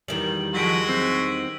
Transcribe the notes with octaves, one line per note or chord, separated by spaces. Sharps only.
E2 D#3 G3 F#7
F3 F#3 G#3 F#4 A#6 B6 D7
C4 E6